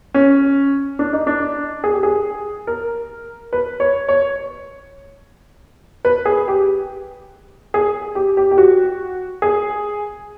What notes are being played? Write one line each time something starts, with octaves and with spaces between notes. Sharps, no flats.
C#4
D4
D#4
D4
G#4
G4
G#4
A#4
B4
C#5
C#5
B4
G#4
G4
G#4
G4
G4
G4
F#4
G#4